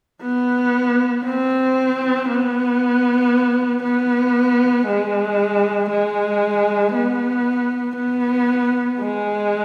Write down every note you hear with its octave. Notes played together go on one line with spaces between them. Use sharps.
B3
C4
B3
B3
G#3
G#3
B3
B3
G#3